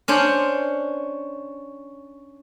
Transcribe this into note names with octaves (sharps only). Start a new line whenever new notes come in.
C#4 D4 C5 C#5